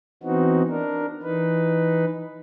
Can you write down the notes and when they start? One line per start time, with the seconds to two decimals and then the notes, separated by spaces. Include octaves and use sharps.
0.23 E3 B3 C4 D#4 F#4
0.69 D4 A#4
1.23 E3 D#4 B4